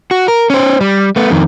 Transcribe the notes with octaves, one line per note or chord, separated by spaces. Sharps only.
F#4
A#4
C#4 C5
G3
A3 B3
F2 D#3